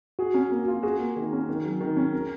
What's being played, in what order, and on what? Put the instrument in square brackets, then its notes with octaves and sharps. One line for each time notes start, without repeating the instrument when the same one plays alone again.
[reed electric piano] F#4 [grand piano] G#4
[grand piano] C#4
A#3
F4
[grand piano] F#4 [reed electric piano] G#4
[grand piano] A#3
D#3
C#4
D#3
F#3
D#3
C#4
A#4